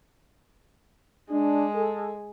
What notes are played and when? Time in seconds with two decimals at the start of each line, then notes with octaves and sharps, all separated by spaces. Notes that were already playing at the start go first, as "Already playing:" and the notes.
1.30 G#3 D4
1.76 A4